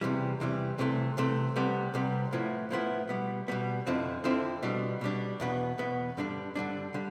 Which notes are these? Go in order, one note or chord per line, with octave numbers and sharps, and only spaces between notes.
E2 C3 E3 G3
E2 C3 E3 G3
C2 C3 E3 A3
C2 C3 E3 A3
C2 C3 G3 B3
C2 C3 G3 B3
A2 F3 B3 E4
A2 F3 B3 E4
B2 G3 B3
B2 G3 B3
F2 D3 F3 C4 E4
F2 D3 F3 C4 E4
B2 G3 D4
B2 G3 D4
E2 B2 B3
E2 B2 B3
G2 D3 G3 D4
G2 D3 G3 D4
D3 G3